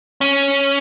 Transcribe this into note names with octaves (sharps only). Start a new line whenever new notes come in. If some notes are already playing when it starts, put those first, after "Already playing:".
C#4